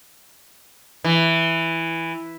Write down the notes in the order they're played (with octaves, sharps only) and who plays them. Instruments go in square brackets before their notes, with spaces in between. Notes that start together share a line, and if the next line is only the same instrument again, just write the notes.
[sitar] E3